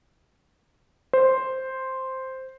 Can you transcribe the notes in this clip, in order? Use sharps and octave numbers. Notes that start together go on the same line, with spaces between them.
C5